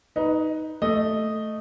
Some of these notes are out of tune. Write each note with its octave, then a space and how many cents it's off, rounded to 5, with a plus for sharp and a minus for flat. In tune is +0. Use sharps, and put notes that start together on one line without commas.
D#4 +10 B4 +0
A3 +0 D#5 +0